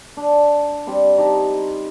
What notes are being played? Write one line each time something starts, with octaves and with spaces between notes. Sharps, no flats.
D4
G3 C4 B5
D#4 G4 A5 A#5